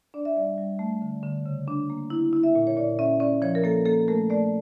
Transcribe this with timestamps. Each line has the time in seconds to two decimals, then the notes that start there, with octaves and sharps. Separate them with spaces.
0.14 D4 D5
0.25 E5
0.36 G3 D5
0.58 G3
0.79 A3
1.02 D3
1.23 D3
1.46 C#3
1.68 D4
1.90 A#3
2.10 E4
2.33 E4
2.43 E5
2.55 A#2
2.67 C#5
2.77 A#2 D5
2.99 C#4 E5
3.20 C#4 D5
3.42 F3 C#5
3.55 A#4
3.64 A#3 A4
3.86 A#3 A4
4.08 A3 A#4
4.30 A3 D5